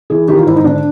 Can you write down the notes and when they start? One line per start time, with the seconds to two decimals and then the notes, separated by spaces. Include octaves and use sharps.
0.10 E3 G#4
0.28 D#3 G4
0.37 F4
0.46 G#2 E4
0.56 D#4
0.64 D3 D4